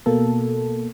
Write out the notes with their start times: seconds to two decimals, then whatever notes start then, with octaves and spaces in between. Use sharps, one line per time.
0.06 B2 A#3 A4